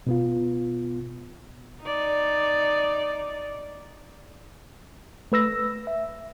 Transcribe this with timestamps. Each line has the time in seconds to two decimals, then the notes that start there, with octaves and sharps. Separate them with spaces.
0.07 B2 B3 F4
1.82 D#4 D5
5.32 A3 B4 E6 A#6
5.87 E5